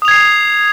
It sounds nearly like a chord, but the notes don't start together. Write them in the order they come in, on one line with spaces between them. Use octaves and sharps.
D#6 F7 G#6 C7